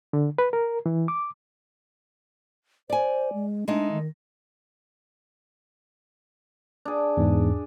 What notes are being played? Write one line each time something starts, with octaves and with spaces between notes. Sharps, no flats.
D3
B4
A#4
E3
D6
C5 D5 G#5
G#3
G#3 A3 D4 D#4
D#3
D4 G#4
E2 G#2